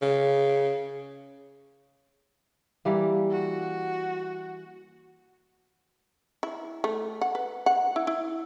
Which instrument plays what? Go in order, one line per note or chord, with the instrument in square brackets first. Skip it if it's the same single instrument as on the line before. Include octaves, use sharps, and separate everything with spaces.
[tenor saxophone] C#3
[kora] E3 G3 A#3
[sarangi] F#4
[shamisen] E4
A3
F#5
B4
F#5
E4
E4